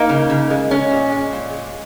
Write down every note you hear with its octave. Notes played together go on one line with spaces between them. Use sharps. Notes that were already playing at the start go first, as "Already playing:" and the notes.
Already playing: A#3 D#4
C#3
C#3
G#3
G#3 C#4
A#2
G#3
A#2
G#3